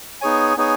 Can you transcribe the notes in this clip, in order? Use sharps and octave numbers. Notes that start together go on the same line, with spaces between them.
B3 D#4 G#4 C#5 G#5
B3 D#4 G#4 C#5 G#5